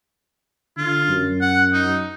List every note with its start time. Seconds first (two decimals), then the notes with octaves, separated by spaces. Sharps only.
0.78 D3 F4
1.08 F#2
1.41 F#5
1.73 D#4